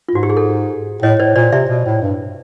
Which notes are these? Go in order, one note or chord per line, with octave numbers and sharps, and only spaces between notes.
F4
G#2 F#4
G4
G#4
A4
A2 C#5 D#5
A2 C5 D5
A#2 C5 D5
C3 D5 E5
B2
A2
G2